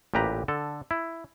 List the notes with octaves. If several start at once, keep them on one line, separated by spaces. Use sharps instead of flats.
A1 A#2 G4 B4 A#5
D3 A4
E4